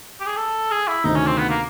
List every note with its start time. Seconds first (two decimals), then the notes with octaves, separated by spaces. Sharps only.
0.20 G4
0.26 G#4
0.37 A4
0.71 G#4
0.88 E4
1.04 D2 C3 D#3 D#4
1.16 C#4
1.27 C4
1.38 B3
1.49 A#3